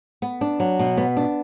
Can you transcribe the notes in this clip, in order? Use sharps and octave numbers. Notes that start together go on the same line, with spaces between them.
B3
D4
F#3
B2
B3
D4